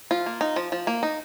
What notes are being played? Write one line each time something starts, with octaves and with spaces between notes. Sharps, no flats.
F3 F4
A#3
D#4
F3
F3
A#3
D#4